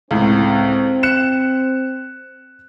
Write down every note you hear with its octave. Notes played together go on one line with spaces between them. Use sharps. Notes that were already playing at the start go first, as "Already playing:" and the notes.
C#2 A2 C4
F#6 C#7 E7